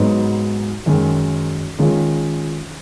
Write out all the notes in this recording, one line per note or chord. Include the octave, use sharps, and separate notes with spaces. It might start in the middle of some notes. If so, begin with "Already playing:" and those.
Already playing: G#2 F#3 B3 D#4
F#2 D#3 G#3
D#3 G#3 C#4 F4